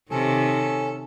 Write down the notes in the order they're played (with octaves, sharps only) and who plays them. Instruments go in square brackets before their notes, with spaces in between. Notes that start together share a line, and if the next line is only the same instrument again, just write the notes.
[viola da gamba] C3 D#3 [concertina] C#4 A4